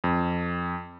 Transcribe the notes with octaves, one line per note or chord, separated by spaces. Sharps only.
F2